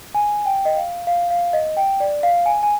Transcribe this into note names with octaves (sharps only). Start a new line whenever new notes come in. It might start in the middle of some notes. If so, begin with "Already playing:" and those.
G#5
G5
D#5
F5
F5
F5
D#5
G5
D5
F5
G#5
G#5